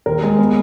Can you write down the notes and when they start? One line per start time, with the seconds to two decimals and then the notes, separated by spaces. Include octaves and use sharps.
0.06 D#2 A#4
0.23 G#3
0.38 B3